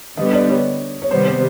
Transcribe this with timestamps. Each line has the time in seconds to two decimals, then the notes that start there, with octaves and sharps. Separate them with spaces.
0.17 D3 G3 B3 D#5
0.33 D5
0.49 C#5
1.02 C#5
1.10 C3 D#3 G3 B3 C5
1.26 C5